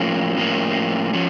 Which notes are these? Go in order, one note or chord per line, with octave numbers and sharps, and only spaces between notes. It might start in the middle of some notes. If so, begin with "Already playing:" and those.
Already playing: A2 F3 A#3 C#4
A2 F3 A#3 C#4
F3 C#4